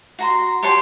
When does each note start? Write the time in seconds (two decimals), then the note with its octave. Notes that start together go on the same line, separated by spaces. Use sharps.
0.19 F#4 A#5 C6
0.63 G4 C#5 A5 C6